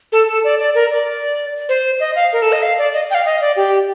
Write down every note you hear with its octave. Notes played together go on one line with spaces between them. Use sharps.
A4
A4
D5
D5
A#4
D5
C5
D#5
F5
A#4
A4
D#5
F5
D5
D#5
G5
F5
D#5
D5
G4